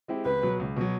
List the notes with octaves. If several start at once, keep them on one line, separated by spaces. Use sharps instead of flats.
G#3 C4 E4 G4
C#2 B4
B2 F#3
C#2
B2 F#3